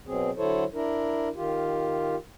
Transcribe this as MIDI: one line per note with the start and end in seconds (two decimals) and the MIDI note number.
0.07 0.30 47
0.07 0.30 54
0.07 0.30 60
0.07 0.30 68
0.37 0.64 50
0.37 0.64 54
0.37 0.64 64
0.37 0.64 69
0.37 0.64 72
0.37 0.64 73
0.74 1.29 62
0.74 1.29 64
0.74 1.29 70
1.35 2.16 51
1.35 2.16 65
1.35 2.16 67